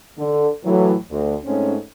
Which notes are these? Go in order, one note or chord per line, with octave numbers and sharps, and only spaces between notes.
D3
A2 E3 F#3
D2
G#2 A3 C4 C#4